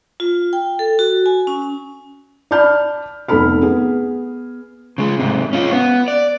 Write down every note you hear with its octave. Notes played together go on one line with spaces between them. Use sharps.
F4
G5
A4
F#4
G#5
C#4
D5 A5 B5 F6 G6
F1 B3 D#4 A4 B5 F6
B3 G#4
C#3 G#3
G#2 C3
C#4 F4
B3
D5